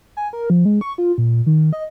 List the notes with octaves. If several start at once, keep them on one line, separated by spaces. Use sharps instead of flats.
G#5
A#4
F3
G#3
C#6
F4
A#2
D#3
D#5